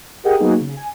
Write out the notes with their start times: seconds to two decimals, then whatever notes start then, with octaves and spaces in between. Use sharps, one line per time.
0.24 G4 G#4 A#4 D#5 F#5 G5
0.39 F#3 A#3 B3 D#4 F#4 G#4
0.60 C#3
0.77 G#5